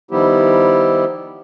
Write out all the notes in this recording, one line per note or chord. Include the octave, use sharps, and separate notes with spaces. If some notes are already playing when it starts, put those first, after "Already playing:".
D#3 F3 G3 B3 E4 G4